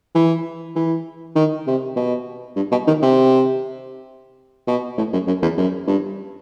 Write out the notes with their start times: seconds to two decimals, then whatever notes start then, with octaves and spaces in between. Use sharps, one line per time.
0.15 E3
0.76 E3
1.36 D#3
1.67 C3
1.96 B2
2.56 G2
2.71 B2
2.87 D#3
3.02 C3
4.67 B2
4.98 A2
5.13 F#2
5.27 F#2
5.42 E2
5.58 F#2
5.88 G2